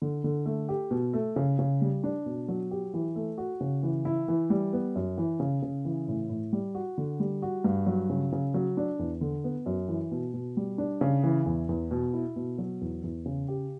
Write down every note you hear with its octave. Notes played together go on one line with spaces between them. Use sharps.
D3
D3
A3
G4
B2
A3
C#3
C#3
G3
D4
B2
F#3
G4
E3
A3
F#4
C#3
E3
E4
E3
G3
B3
F#2
E3
C#3
C#3
E3
A2
A2
G3
F#4
D3
G3
F#4
G2
F#3
C#3
C#3
F#3
D4
E2
D3
B3
F#2
E3
B2
B2
G3
D4
C#3
E3
E2
E2
B2
E4
B2
F#3
E2
E2
C#3
G4